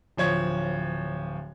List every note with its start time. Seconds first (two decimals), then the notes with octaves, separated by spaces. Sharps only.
0.17 D1 F3 C#5 G#6